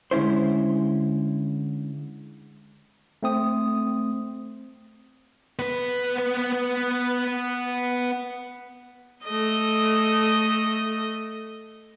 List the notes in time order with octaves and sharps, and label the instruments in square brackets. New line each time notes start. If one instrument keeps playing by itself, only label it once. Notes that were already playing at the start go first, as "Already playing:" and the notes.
[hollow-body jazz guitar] D3 G#3 C#4 E4 C5
[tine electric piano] A3 C4 D#6
[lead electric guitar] B3 B4
[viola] A3 D#5